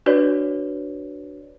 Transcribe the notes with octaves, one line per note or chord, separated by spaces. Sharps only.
D4 F#4 B4 C#5 D5